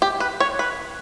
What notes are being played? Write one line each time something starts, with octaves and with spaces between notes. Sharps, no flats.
G4
B4
C#5
B4